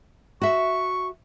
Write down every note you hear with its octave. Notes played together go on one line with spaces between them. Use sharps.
F#4 E5 C#6